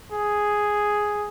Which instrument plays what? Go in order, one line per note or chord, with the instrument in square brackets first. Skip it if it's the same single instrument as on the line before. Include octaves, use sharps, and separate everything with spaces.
[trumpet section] G#4